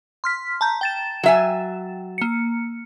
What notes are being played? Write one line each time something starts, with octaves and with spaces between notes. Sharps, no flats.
C6 F6 B6
A5 A#5 G6
G5 A6 E7
F#3 E5 G#5
A#3 C#7